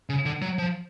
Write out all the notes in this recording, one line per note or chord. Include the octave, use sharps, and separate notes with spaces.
C#3
D3
F#3
F3